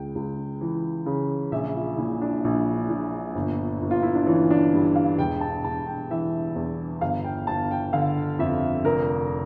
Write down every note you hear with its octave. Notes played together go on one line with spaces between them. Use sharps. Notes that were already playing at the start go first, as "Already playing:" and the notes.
Already playing: C#2 G5
C#2
E3
C#3
A#1 E5
F4
A#2 E4
D4
A#1
A#2
G1
G1
F4
E4
D4
E3 C#4
D4
G2 G4
F5
E1 G5
A5
E1 A5
G5
E3 E5
E2
G1 F5
G5
G1 A5
G5
D3 F5
F2 E5
F1 A#4